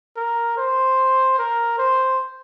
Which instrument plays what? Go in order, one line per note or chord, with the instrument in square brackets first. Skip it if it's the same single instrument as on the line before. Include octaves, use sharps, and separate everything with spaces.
[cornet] A#4
C5
A#4
C5